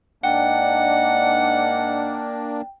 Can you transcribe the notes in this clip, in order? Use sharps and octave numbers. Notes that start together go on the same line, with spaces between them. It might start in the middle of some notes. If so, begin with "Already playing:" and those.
G#2 A#3 D4 D5 D#5 F#5 G5